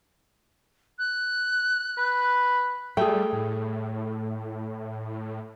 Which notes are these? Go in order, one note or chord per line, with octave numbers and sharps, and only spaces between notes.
F#6
B4
G3 A3 G#4 G5
A2